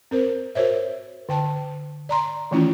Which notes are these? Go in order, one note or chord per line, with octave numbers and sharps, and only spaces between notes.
C4 A#4 C5
F#4 A#4 C5 C#5 E5
D3 G5 A5
D5 A#5 C6
D#3 E3 A3 C#4 E4 F4